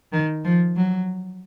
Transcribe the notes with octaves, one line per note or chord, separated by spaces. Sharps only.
D#3
F3
F#3